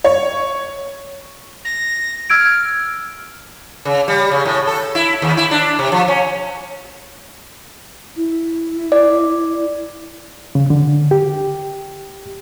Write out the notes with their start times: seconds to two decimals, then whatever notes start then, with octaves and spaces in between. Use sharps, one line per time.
0.04 C#5
1.65 A#6
2.30 E6 F6 G#6 D7
3.85 C#3
4.08 G3
4.32 C#3
4.46 A2
4.67 A4
4.95 E4
5.22 D#2
5.37 E4
5.51 D4
5.79 C3
5.92 F3
6.08 C#4
8.17 E4
8.92 D5
10.55 C#3
10.70 D3
11.11 G4